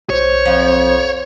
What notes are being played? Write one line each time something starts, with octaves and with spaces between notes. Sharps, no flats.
B1 C5 C#5
F2